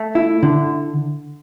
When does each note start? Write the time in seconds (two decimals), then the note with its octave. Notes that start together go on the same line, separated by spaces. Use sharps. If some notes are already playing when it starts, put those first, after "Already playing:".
Already playing: A3
0.15 E4
0.43 D3